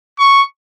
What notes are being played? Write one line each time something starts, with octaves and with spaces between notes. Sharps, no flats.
C#6